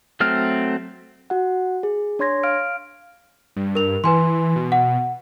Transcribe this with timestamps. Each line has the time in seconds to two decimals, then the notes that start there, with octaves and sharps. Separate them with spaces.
0.20 F#3 A3 C4 F6
1.30 F#4 F#5
1.83 G#4
2.19 D4 C#5 C6 G#6 A#6
2.43 F5 F6 D7
3.56 G2
3.75 A#4 F7
4.04 E3 B4 G#5 C6
4.56 B2
4.72 F#5